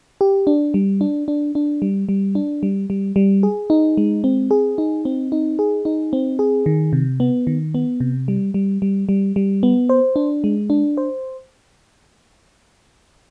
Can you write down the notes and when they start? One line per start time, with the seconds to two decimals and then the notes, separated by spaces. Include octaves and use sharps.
0.21 G4
0.47 D4
0.74 G3
1.01 D4
1.28 D4
1.55 D4
1.82 G3
2.09 G3
2.35 D4
2.63 G3
2.90 G3
3.16 G3
3.43 G#4
3.70 D#4
3.97 G#3
4.24 C4
4.51 G#4
4.78 D#4
5.05 C4
5.32 D#4
5.59 G#4
5.85 D#4
6.13 C4
6.39 G#4
6.66 D#3
6.93 C3
7.20 B3
7.47 D#3
7.75 B3
8.00 C3
8.28 G3
8.54 G3
8.82 G3
9.09 G3
9.36 G3
9.63 B3
9.89 C5
10.16 D4
10.44 G#3
10.70 D4
10.97 C5